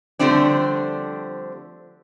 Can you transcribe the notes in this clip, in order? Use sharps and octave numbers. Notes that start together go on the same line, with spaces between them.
D3 F3 G3 A3 C4 D4